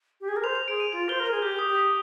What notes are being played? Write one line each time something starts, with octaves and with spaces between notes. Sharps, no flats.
G4
G#4
A#4
C5 F7
F7
G#4 D7
D#7
F4 F7
C5 G7
A#4
F7
G#4
G4 G6
D#6
G4
D#6